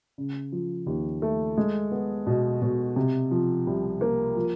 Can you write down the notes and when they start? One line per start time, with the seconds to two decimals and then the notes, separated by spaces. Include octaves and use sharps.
0.18 C#3
0.52 F3
0.87 D#2
1.22 A3
1.58 G#3
1.92 B3
2.27 B2
2.62 B2
2.96 C3
3.31 F3
3.67 C2
4.01 A#3
4.37 F3